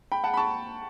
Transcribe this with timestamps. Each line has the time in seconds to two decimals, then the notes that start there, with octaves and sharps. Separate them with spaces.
0.12 G5 B5
0.24 F#5 A5
0.34 B5
0.37 A5 C#6